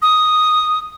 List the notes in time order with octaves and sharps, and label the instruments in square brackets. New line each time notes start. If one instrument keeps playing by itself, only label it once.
[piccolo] D#6